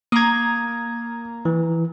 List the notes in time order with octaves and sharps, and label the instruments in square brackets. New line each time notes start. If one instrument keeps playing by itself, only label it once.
[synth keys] A#3 A#5 [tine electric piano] D#6 G#6
[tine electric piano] E3